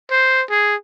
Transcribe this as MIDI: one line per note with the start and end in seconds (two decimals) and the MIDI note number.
0.11 0.43 72
0.50 0.75 68